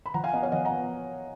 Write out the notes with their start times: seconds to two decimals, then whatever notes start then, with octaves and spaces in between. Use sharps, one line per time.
0.06 B5
0.14 F3 F#5 A#5
0.24 F5 G#5
0.33 B3 D#5 F#5
0.43 C#5 F5
0.52 F3 D#5 F#5
0.65 F#5 A#5
0.71 B3